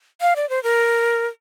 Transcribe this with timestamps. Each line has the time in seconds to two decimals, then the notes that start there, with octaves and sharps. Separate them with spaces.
0.21 F5
0.36 D5
0.49 C5
0.63 A#4